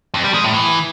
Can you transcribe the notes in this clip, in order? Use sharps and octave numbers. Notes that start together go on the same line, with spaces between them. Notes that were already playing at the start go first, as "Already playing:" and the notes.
F2
G3
G#3
A2
E3